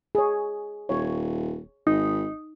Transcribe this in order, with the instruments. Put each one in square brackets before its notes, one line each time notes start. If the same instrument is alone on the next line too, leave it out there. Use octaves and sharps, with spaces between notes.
[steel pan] G#4 C#5
[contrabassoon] D#1 [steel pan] C#5
[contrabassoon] G#1 [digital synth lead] D#4